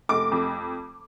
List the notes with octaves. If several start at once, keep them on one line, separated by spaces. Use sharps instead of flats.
F1 D6
F2